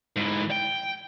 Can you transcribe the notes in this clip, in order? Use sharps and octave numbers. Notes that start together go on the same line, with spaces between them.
G#2 E3
G5